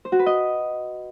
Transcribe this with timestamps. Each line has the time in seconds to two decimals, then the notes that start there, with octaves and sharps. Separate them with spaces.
0.05 C5
0.12 F#4
0.19 B4
0.26 D#5